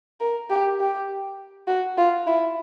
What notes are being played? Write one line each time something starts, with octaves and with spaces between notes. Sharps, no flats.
A#4
G4
G4
F#4
F4
E4